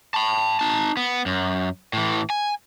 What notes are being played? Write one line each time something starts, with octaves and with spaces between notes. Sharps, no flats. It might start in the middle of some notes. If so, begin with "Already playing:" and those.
A5 B5
D#4 A5
B3
F#2
A2 E3
G#5